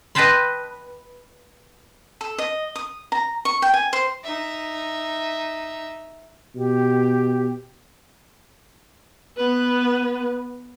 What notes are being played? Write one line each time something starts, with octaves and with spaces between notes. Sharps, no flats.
B4 D#5 G5 A5 B5 C6
A4
D#5
D#6
A#5
C#6
G5
G#5
C5
D#4 E5
B2 G4
B3 B4